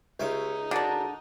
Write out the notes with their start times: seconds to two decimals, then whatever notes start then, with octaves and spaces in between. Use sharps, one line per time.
0.20 C#2 D#4 F4 G4 C#5 E5
0.71 D3 D4 F#4 A#4